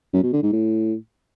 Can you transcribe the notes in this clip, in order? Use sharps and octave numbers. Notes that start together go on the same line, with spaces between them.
F#2
B2
D3
G#2
A2